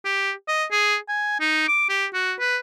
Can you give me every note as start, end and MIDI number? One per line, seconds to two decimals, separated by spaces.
0.05 0.32 67
0.48 0.65 75
0.71 0.97 68
1.08 1.37 80
1.40 1.64 63
1.68 1.86 86
1.89 2.06 67
2.14 2.34 66
2.39 2.58 71